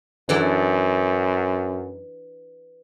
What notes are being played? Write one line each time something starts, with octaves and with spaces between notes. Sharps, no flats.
F#2 E3 D4 A4